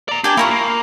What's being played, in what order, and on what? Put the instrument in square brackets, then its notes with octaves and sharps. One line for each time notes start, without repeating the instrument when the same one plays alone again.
[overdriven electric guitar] D5 A#5
[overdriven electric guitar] D4 [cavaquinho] G4 G#5
[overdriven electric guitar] A#3 F4 [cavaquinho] E4 A#4 C#6
[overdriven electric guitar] A#3